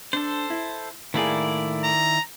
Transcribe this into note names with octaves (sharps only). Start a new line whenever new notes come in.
D4 A4 C5
E4
A2 D#3 A#3 E4 G#4 D5
A#5